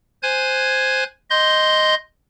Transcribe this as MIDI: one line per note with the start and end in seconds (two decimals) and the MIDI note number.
0.23 1.04 72
0.23 1.04 80
0.23 1.04 90
0.23 1.04 92
1.30 1.95 75
1.30 1.95 84
1.30 1.95 91